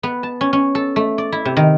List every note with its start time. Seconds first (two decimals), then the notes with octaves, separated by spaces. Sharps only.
0.03 B3
0.23 A5
0.41 C#4
0.53 C#4
0.75 A4
0.96 A3
1.18 D5
1.32 E4
1.45 C3
1.57 D#3